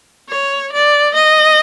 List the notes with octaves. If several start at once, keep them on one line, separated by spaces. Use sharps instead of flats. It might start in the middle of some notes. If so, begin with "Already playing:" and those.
C#5
D5
D#5